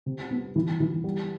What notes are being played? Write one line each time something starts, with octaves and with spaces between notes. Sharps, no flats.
C3
B3
E3
E3
G3